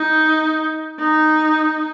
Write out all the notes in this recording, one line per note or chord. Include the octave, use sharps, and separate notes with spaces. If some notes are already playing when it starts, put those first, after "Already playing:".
Already playing: D#4
D#4